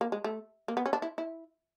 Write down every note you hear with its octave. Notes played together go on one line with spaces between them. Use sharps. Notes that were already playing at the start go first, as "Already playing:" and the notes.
A#3
G#3
A3
A#3
B3
C#4
D4
E4
E4